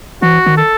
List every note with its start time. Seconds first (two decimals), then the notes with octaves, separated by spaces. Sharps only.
0.22 E3 F#4
0.46 D#3
0.57 A4